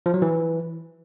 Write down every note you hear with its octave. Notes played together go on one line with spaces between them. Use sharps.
F3
F#3
E3